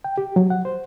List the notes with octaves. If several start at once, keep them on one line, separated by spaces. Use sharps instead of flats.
G5
G4
F#3
F#5
C5